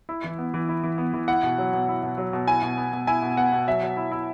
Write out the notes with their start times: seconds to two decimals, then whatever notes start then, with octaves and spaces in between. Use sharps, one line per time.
0.09 E4
0.24 E3
0.38 B3
0.54 E3
0.69 E4
0.83 E3
0.98 B3
1.13 E3
1.28 E4 F#5
1.43 B2
1.58 F#3
1.73 B2
1.89 E4
2.03 B2
2.18 F#3
2.33 B2
2.48 E4 G#5
2.62 B2
2.77 B3
2.93 B2
3.07 E4 G#5
3.22 B2
3.37 B3 F#5
3.52 B2
3.67 F#3 E5
3.82 F#3
3.97 E4
4.12 E4